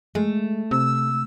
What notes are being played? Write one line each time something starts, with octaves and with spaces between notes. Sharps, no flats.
G#3 A3
C3 E6